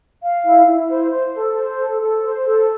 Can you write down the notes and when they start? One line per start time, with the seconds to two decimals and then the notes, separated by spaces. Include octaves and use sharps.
0.22 F5
0.45 E4
0.66 E4
0.89 C5
1.11 C5
1.34 A4
1.57 C5
1.78 A4
2.01 A4
2.23 C5
2.46 A4